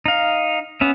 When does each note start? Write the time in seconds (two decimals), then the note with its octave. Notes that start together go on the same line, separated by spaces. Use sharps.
0.06 D#4 F5
0.81 B3 C#4 E5